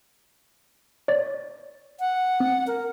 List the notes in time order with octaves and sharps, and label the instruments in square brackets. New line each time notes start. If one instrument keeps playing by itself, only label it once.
[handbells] C#5 D5 A6
[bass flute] F#5
[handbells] C4
[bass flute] A#4